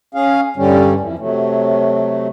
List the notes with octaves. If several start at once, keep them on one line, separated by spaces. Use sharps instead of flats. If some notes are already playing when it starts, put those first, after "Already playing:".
C#4 G#4 F5
G2 D3 G3 C#4
F2 E3
C3 F#3 A3